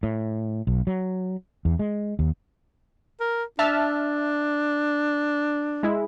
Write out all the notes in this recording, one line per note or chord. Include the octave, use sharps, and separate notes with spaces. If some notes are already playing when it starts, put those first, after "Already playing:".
A2
B1
F#3
E2
G#3
D#2
A#4
D4 E5 A5 F6
G#3 E4